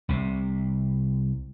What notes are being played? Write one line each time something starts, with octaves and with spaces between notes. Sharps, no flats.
C2 C3